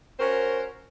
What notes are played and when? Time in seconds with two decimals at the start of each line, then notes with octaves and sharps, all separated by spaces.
0.19 C#4 F#4 A#4 C5